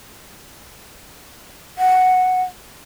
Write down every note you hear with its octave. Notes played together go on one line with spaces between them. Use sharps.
F#5